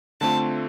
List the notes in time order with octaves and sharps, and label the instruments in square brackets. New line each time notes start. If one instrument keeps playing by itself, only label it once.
[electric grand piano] D3 A3 C4 F4 [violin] A5